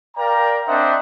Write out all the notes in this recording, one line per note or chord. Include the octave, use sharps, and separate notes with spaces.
A#4 D5 F5 G5 A#5
C4 D4 C5 D#5 E5 F#5